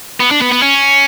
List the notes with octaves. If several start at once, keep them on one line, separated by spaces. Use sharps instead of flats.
B3
D4
B3
B3
C#4